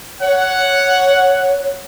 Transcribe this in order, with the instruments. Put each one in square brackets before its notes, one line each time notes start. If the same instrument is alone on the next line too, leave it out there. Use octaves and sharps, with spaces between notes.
[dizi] C#5 [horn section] F#5